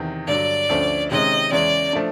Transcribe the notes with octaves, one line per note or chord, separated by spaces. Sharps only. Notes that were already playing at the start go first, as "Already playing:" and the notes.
Already playing: E2 C3 D#3
G2 D3 F#3 D5
D2 D3 F3 A3 C#4
C3 D#3 G#3 C#4 D#5
E2 C#3 E3 G#3 C#4 D5
F3 A3 D4